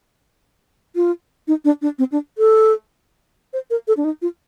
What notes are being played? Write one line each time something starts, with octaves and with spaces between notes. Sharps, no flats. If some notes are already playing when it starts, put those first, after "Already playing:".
F4
D#4
D4
D4
C4
D4
A4
C5
A#4
A4
D4
D#4
F4